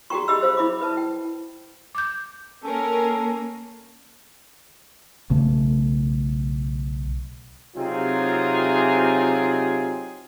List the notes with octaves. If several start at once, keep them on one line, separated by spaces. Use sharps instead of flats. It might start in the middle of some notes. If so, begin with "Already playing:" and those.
F#4 G#4 A4 G5 A#5 C#6
G4 G#4 D#5 E5 B5 E6
C5 F5
E4 E5 B5 D6
B4 E5 A5
G5
D6 G6
A#3 C#4 A4 A#4
B1 C#3 A3
C3 F#3 C4 D#4 F4 G#4